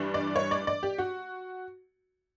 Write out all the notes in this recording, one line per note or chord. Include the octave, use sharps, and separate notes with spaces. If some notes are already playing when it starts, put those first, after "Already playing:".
Already playing: G2 E3 G3 D4
D5
C#5
D5
D5
G4
F#4